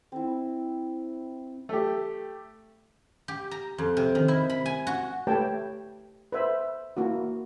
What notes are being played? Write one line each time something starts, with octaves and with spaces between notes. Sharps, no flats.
C4 E4
A3 G4
G4
A#5
F2
C3
D#3
E4
B5
G#5
F#4
A3 G4 B4 C#5 G5 A5
B4 C5 E5
A#3 E4 F#4